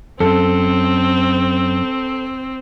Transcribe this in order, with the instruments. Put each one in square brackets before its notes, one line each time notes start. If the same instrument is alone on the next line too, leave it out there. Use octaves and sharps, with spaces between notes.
[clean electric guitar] F#2 [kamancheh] C4 [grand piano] A4